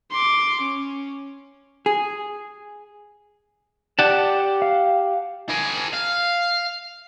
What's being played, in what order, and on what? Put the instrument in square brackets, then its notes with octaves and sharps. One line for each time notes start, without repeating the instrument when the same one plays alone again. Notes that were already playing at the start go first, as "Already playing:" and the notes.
[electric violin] C6 D6
C#4
[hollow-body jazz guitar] G#4
[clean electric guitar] G4 F#5 A5 [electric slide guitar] D5
[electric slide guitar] F5
[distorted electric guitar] G#4 A#4
F5